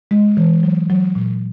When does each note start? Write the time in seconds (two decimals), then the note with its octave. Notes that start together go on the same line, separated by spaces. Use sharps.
0.11 G#3
0.37 E3
0.63 F#3
0.90 F#3
1.15 A#2